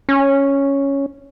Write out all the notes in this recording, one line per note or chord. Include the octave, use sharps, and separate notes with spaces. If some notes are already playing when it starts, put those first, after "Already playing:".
C#4